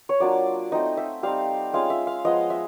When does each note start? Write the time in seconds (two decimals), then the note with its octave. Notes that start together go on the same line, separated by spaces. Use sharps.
0.09 C#5
0.20 F#3 A#3 D4 F4 D5
0.72 A3 C4 D#4 D#5
0.97 E5
1.23 G3 C4 D#4 F5
1.74 G#3 C#4 F4 F5
1.90 E5
2.07 F5
2.25 F3 G#3 B3 D#5
2.50 E5